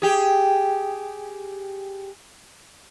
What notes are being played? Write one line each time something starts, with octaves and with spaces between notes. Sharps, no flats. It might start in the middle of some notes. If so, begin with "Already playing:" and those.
G4 G#4